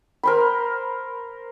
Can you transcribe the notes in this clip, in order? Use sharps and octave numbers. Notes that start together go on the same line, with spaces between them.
A#4 C5 B5